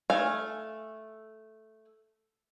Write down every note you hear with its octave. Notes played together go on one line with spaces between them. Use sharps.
A3 F5 G#5